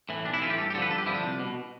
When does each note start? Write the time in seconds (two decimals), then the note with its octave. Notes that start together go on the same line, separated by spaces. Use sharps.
0.09 A2 E3
0.25 B1 D4
0.34 E4
0.42 E3 F4
0.46 A2 G4
0.58 G2 A4
0.70 G4
0.74 D3 A4
0.78 F3 B4
0.91 G2 A4
0.98 G4
1.06 D3 F3 E4
1.15 D4
1.23 C2
1.40 B2